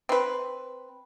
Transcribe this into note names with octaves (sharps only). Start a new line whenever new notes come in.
C4 B4